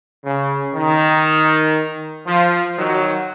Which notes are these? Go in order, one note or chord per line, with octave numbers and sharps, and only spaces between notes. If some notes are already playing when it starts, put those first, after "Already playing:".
C#3
D#3
F3
D#3 F#3